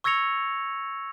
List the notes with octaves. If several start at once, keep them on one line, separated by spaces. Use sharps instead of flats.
C#6 E6 G#6 A#6 C#7 F7